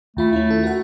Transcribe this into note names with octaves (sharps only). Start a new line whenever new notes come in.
D#2 A3 F4 B5
C#4 E4
A4
F#4 A#4 F#5